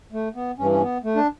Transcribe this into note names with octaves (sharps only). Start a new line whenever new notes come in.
A3
B3
G2 E3 C#4
C#4
B3
A3
D4